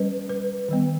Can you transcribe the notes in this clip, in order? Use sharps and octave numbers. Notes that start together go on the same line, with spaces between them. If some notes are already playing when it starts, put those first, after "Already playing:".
Already playing: G3 C#4 B4
B4
D#3 G3 B3